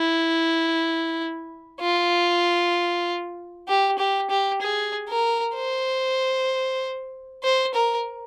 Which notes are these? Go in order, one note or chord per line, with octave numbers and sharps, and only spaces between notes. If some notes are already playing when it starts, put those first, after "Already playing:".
Already playing: E4
F4
G4
G4
G4
G#4
A#4
C5
C5
A#4